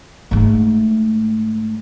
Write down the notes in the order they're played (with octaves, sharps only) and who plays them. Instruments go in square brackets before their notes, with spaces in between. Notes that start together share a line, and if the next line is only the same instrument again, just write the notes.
[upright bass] G#2 A3